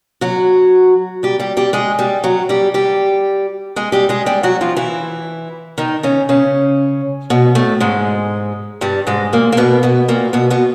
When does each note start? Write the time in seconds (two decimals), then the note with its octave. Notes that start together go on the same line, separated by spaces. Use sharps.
0.21 F#3 F#4
1.23 G3 G4
1.40 G3 G4
1.57 G3 G4
1.73 G#3 G#4
1.99 G3 G4
2.24 F#3 F#4
2.49 G3 G4
2.74 G3 G4
3.76 G#3 G#4
3.92 G3 G4
4.09 G#3 G#4
4.26 G3 G4
4.43 F#3 F#4
4.61 F3 F4
4.77 E3 E4
5.78 D#3 D#4
6.03 C#3 C#4
6.29 C#3 C#4
7.30 B2 B3
7.55 A2 A3
7.80 G#2 G#3
8.81 G2 G3
9.07 G#2 G#3
9.33 A#2 A#3
9.52 A#3
9.57 B2 B3
9.83 B2 B3
10.08 A#2 A#3
10.33 B2 B3
10.50 B2 B3